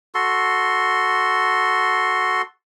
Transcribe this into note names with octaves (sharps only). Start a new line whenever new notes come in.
F#4 A4 C6